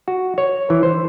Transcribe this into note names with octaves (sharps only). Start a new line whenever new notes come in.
F#4
C#5
E3
C5